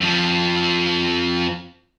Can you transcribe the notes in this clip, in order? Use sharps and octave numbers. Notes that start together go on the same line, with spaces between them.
F2 F3